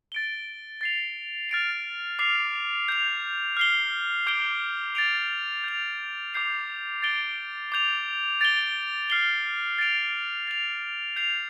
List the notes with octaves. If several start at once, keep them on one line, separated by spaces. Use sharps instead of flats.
A6 D7 G7
A6 C7 F7
F6 A6 D7 F7
D6 F6 C7 F7
G6 F7
F6 C7 G7
D6 G6 D7 G7
A6 D7 F7
G6 F7
D6 G6 C7 F7
A6 D7 G7
D6 G6 F7
A6 D7 G7
F6 C7 G7
A6 D7 F7
A6 F7
G6 C7 F7